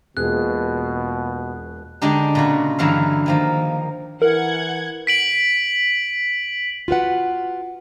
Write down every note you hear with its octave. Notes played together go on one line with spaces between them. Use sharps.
E1 B2 A#3 F4 G#4 F#6
D3 G#3 D4 D#4 G4
A#2 C#3 F#4
G2 D3 E3 F#3 E5 F5
D#3 F3 A#3
E3 A#4 F#5 G#6
B6 D7 F#7
F4 F#4 B4 F#5